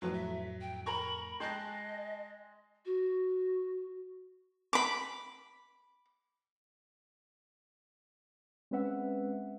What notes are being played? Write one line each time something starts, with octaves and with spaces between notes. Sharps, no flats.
F2 A2 F#3 B4
E5
G5
A#4 A#5 B5 C#6
G#3 D#5 G5 A5 F#6
F#4
B5 D6
G#3 C4 C#4 B4 E5 F#5